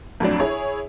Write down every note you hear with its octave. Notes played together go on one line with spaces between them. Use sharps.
F2 A2 F#3 D4
E4 G#4 C#5